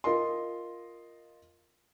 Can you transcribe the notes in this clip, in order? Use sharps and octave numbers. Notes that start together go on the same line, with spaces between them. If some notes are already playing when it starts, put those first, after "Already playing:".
F4 A#4 D#5 C6